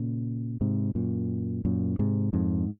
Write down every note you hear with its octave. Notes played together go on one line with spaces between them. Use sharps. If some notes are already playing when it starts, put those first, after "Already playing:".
Already playing: A#2 C#3
G#2 C3
F#2 A#2
F#2 A#2
G#2 C3
F2 G#2